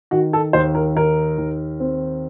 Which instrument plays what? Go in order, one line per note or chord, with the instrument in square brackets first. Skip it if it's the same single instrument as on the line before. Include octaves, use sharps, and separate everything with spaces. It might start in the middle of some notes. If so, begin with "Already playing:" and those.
[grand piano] D#3 [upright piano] F#4
[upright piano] A4
[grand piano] D#2 [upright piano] C5
[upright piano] A#4
[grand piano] D#3 [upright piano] A#4
[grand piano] D#2
C4